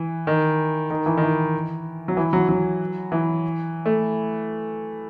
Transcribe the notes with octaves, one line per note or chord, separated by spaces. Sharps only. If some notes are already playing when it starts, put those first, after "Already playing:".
Already playing: E3
D#3
D#3
E3
D#3
E3
F#3
E3
F#3
F#3
E3
A3